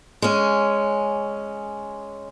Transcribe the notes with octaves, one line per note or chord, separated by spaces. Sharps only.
G#3 C#4